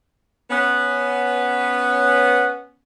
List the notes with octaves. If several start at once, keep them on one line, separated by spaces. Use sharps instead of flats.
B3 C#4